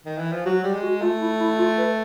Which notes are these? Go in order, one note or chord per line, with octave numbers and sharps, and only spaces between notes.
D#3
E3
F3
F#3 F#4
G3 G4
G#3
F#4
A3 F4
E4
E4
F4
B4